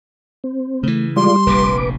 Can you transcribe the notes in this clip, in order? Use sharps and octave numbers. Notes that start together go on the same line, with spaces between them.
C4
C#3 E3 A3
G3 G#3 F4 D5 C6
F1 A#1 C3 B4 D6